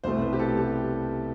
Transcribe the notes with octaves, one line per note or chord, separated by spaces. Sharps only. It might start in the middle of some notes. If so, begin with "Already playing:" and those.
C2 B2 A3 C5
B4
G4
A4
G4